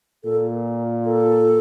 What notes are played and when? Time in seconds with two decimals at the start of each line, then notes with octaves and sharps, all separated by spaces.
0.24 A#2 A4
1.05 A4